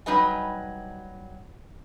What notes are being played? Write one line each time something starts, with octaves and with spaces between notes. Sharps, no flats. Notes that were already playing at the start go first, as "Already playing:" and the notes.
F#3 G3 D#4 B4 D#5 G#5